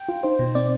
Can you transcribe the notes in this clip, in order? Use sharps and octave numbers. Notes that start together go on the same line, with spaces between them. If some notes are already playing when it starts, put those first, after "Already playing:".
Already playing: G5
F4
D#4 C5
B2
C4 D5